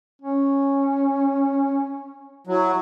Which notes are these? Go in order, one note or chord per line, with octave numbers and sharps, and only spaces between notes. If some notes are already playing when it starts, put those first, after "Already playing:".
C#4
F#3 E4